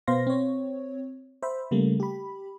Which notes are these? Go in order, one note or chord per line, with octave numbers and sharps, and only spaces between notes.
B2 B3 C5 F5 C6 A#6
C4 C#5
C5 E5 B5
C#3 G3 A3 A#3
G4 B5